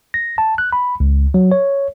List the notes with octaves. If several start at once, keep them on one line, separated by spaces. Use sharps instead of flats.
A#6
A5
F#6
B5
C#2
F#3
C#5